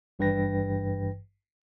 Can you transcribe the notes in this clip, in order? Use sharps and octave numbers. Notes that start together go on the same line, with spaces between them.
G#1 G2 E3 B4 G5 A#6